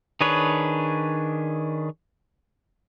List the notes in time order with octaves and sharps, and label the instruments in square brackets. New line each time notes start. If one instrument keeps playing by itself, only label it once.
[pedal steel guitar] D#3 D4 G#4 B4 C#5